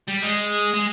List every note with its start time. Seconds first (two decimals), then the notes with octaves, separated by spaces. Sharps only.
0.08 G3
0.23 G#3
0.74 G#3